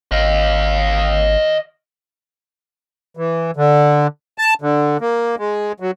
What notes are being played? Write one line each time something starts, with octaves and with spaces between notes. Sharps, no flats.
G#1 D#5 F5
E3
D3
A5
D3
A#3
G#3
F#3